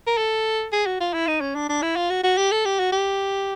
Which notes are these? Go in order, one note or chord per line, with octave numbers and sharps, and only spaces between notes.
A#4
A4
G#4
F#4
F4
E4
D#4
C#4
D4
D4
E4
F4
F#4
F#4
G4
A4
G4
F#4
G4